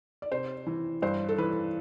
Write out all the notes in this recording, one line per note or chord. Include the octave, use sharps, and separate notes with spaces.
D5
C3 C5
E3
G2 C5
A4
E3 B4